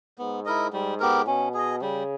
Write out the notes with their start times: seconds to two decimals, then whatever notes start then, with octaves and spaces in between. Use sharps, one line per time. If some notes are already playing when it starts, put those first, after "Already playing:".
0.18 G#2 B3
0.45 E4 A#4 D#5
0.73 G#2 G3
1.00 B3 G4 A#4
1.27 B2 C#4
1.54 G#4 D#5
1.82 C#3 G3